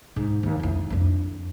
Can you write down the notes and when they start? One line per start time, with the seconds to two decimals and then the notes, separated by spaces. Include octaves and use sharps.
0.16 G#2
0.43 D#2
0.60 F2 E4
0.90 F2 D4